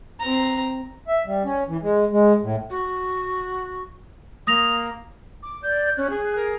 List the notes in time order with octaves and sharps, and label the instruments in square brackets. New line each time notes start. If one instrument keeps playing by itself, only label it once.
[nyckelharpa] C4 A#5
[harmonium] E5
G3
C#4
E3
G#3
G#3
A2
[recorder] F#4
[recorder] A#3 [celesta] D#6 A#6 F7
[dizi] D6
[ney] D5 [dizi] G6
[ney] C#4 [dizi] F#6
[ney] G#4
[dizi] A#4